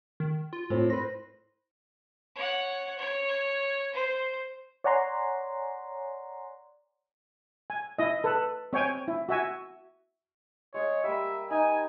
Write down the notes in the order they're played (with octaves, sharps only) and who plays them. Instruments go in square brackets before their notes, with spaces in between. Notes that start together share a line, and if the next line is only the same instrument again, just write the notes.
[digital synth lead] D#3
F4
[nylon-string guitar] A2 C4
[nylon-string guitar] B4 C5 [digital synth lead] A#6
[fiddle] C#5 F#5
C#5
C5
[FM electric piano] C#5 D5 F#5 G#5 A#5 C6
[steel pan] G#5
E4 D#5
A4 B4
C4 C#5 G5 G#5
E4
F#4 E5 G#5
[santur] G#3 G#4 [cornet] C#5
[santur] G3 A#3 [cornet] E5
[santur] D#4 [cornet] G#5